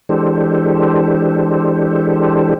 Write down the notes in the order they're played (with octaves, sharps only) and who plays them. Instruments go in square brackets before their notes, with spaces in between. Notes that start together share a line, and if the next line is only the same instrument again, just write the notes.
[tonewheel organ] E3 G#3 D4 G4 A4 C5